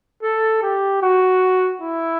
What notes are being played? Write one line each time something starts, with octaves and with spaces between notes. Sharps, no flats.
A4
G4
F#4
E4